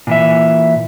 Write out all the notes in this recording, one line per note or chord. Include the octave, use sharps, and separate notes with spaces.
A#2 E3 E5